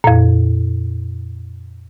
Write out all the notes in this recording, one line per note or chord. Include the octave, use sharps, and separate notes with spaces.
F2 A#2